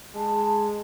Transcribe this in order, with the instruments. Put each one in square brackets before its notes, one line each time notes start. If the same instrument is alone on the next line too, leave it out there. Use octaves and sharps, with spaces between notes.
[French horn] G#3 [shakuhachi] A5